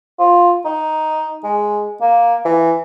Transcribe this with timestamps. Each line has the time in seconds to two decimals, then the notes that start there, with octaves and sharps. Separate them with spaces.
0.19 F4
0.65 D#4
1.44 G#3
2.01 A#3
2.45 E3